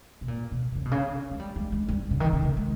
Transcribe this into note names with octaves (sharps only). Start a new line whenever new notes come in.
B2
A#2
B2
B2
C#3
B2
C#3
G#3
G3
G#3
G#3
G3
C#3
D#3
C#3
C#3
G#3